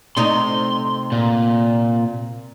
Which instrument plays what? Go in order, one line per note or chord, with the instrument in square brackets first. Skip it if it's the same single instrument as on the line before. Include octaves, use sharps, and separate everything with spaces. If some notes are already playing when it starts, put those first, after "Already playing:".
[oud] C3 A3 D#4 [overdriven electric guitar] C6
[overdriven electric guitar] A#2